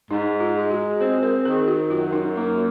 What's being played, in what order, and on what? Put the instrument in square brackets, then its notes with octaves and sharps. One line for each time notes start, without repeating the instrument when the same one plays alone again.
[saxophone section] G#2 [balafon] D#4
[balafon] F4
[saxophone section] G#3
[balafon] F#4
[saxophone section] C4 [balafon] G#4
[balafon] A#4
[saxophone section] D#3 [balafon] G#4
[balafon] F#4
[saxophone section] F#2 [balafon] F4
[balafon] D#4
[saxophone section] A#3 [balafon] D#4